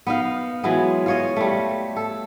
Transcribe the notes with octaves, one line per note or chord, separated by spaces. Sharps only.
B3 D#4 F5
E3 F#3 G#3 B3
F4 C#5 D#5
G3 A3
A4